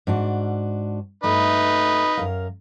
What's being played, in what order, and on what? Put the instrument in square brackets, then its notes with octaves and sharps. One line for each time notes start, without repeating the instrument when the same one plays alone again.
[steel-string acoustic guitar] G#2 D4 F#4
[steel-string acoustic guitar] G2 A3 [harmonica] D#4 B4
[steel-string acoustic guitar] F#2 A#4 F5